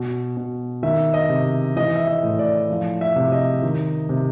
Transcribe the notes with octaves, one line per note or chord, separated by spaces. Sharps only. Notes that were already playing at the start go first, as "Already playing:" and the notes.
Already playing: B2
B2
D#3 E5
D#5
C3
E3 D#5
E5
D#5
A2
D5
F3
E5
C3
D#5
D#3
C3